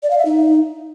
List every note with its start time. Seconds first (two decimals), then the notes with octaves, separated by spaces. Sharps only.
0.03 D5
0.10 F5
0.18 E5
0.25 D#4